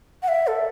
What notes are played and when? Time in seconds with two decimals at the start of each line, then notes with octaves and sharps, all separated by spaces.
0.23 F#5
0.28 E5
0.47 A4